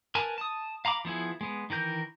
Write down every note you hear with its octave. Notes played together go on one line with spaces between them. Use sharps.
A#4 B4 G#5 A5
A5 D#6
F5 A#5 B5 D6
F3 B3 E4 G#4
G#3 B3
D#3 E3 A#4 G6